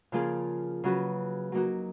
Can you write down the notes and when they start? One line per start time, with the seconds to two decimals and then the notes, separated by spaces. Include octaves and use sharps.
0.12 C#3 F3 A#3 F4 G#4
0.84 C#3 F#3 C#4 F#4 B4
1.52 F#3 A#3 D#4 F#4